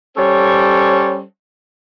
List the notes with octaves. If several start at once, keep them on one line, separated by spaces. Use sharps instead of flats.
G3 C#4 A4 C5 C#5